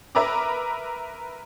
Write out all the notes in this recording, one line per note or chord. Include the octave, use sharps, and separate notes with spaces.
A#4 B4 E5 A#5 B5 D6